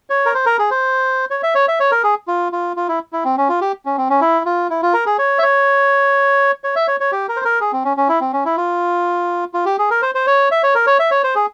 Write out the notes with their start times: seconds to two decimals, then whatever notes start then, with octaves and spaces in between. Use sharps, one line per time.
0.10 C#5
0.26 A#4
0.34 C5
0.46 A#4
0.59 G#4
0.71 C5
1.31 C#5
1.43 E5
1.55 C#5
1.68 E5
1.80 C#5
1.91 A#4
2.04 G#4
2.28 F4
2.52 F4
2.76 F4
2.88 E4
3.13 E4
3.25 C4
3.37 C#4
3.49 F4
3.61 G4
3.86 C#4
3.97 C4
4.09 C#4
4.21 E4
4.46 F4
4.70 E4
4.83 F4
4.94 A#4
5.06 G#4
5.19 C#5
5.39 E5
5.43 C#5
6.64 C#5
6.76 E5
6.87 C#5
7.00 C#5
7.12 G4
7.29 A#4
7.37 C5
7.45 A#4
7.61 G#4
7.72 C4
7.85 C#4
7.97 C#4
8.09 E4
8.21 C4
8.33 C#4
8.45 E4
8.57 F4
9.54 F4
9.65 G4
9.79 G#4
9.90 A#4
10.02 C5
10.15 C5
10.27 C#5
10.51 E5
10.63 C#5
10.75 A#4
10.87 C#5
10.99 E5
11.11 C#5
11.24 C5
11.35 G#4